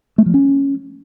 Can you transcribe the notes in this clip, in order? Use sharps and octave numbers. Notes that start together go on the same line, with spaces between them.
A3
F3
C#4